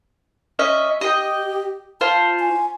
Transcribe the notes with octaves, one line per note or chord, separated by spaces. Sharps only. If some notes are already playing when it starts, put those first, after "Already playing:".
C#4 D#5 E5
G4 D#5 G5
F4 C5 A5
G#5